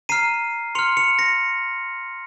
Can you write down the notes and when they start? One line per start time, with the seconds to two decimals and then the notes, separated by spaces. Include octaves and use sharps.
0.09 A#5 F6 C7 D#7
0.75 C6 F6 C#7 F7
0.97 C#7 F7
1.19 A#6 C#7